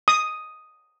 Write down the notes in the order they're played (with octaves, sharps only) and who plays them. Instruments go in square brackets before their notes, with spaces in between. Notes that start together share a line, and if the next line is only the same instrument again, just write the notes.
[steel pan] D#6